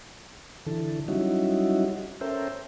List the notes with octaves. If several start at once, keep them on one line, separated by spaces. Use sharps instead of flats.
D3 E3 A4
F#3 G3 C#4 D#4 E4 F#4
C#4 A4 A#4 C5 E5 G5